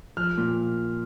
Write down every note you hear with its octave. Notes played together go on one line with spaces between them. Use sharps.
F3 F6
A#2